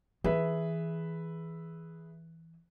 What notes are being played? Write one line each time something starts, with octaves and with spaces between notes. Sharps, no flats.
E3 G#4 B4 E5